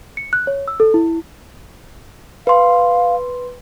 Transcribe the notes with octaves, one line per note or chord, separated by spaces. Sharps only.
C#7
F#6
C#5
E6
A4
E4
B4 F5 C6